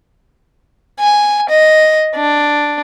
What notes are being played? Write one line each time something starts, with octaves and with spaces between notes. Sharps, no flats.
G#5
D#5
D4